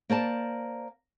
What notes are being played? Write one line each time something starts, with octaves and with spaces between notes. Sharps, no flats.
A#3 C5 D5 A5